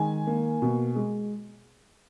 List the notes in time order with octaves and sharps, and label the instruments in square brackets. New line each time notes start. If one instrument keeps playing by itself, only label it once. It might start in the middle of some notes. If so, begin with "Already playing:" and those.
Already playing: [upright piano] D#3 G#3 G#5
A#3
B2
G#3